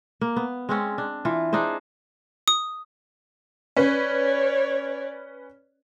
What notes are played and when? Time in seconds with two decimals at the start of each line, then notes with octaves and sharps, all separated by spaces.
0.21 A#3
0.36 B3
0.69 G#3 C4 C#4
0.98 D4
1.25 E3 F4
1.53 D4 D#4 G#4 C5
2.48 D#6
3.77 C#4 B4 C#5 D5